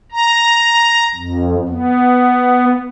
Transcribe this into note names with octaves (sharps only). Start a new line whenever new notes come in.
A#5
F2
B3